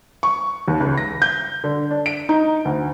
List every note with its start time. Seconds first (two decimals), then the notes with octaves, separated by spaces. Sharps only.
0.23 C#6
0.68 D#2
0.80 C#2
0.97 A#6
1.22 G6
1.64 D3
1.91 D4
2.06 D7
2.29 D#4
2.65 D2